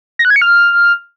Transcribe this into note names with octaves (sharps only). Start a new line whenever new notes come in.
A#6
F#6
G#6
C#7
F6